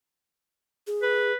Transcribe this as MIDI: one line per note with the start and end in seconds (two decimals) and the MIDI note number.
0.87 1.32 68
1.02 1.37 71